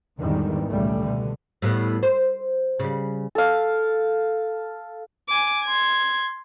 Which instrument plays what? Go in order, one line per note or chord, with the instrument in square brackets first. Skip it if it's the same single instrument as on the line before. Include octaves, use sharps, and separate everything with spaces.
[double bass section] G#1 E2 D3 D#3 G3
C#2 A#2 C#3 G3 A3
B2 D3
[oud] A2 G3 B3
C5
C#3 G3
[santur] A4 F5
[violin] G#5 D6
C6 G#6